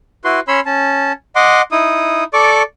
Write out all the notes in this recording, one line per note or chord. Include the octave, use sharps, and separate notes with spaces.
E4 F#4 B4 C6
C#4 C#5 B5 C6 E6
C#4 A5
D#5 F#5 C6 D6
D#4 E4 D#6
A4 D5 C#6 D6